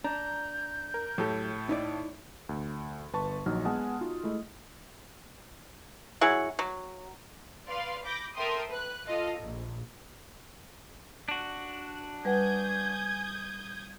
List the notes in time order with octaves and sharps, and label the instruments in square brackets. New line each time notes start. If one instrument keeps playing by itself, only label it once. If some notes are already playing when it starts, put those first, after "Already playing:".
[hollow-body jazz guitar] D4 [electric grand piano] A#5 [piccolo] G6
[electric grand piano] A#4
[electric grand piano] A2 A4 [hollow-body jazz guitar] F#3 G4
[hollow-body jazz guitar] D#4 E4 D5
[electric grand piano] D2
G1 B4 A5 C#6
A#1 F#3 D#4 F6
G#3 B3 F#5 G#5 A5 D#6
D#4 F4 F#4
G#3 A3 E4 D#5
[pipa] F#3 E4 G#4 F#5
F#3
[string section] B4 D5 F5 C6
B5 D6 G6 A#6
A4 A#4 E5 G5 C6 D#6
B4 F#6
F4 A4 D#5 F5
A#1
[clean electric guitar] D4 F#4
[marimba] G3 B4 F#5 [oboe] G#5 [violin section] D#6 G6 G#6